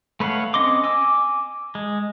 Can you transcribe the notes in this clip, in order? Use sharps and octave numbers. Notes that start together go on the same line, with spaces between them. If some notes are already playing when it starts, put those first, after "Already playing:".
A3 B4 C#5 F5 F#5
C4 C#4 D#5 C6 D6
G#5 D6 E6
G#3